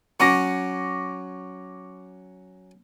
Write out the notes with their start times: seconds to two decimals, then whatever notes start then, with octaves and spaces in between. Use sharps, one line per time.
0.20 F#3 C#4 F#5 C#6 D6 A#6